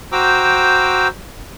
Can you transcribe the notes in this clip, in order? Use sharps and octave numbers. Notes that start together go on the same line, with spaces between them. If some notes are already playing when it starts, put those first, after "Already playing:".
F#4 C5 G5 A#5 D6 E6